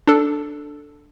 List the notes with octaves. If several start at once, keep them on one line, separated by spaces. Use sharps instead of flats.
D4 A4